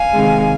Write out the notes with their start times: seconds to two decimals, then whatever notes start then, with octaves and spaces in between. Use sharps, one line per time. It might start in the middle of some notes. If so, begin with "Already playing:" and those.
Already playing: F5 G#5
0.14 C3 D#3 G#3